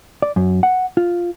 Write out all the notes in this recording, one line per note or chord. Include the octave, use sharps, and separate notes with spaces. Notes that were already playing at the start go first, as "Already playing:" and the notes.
D5
F#2
F#5
F4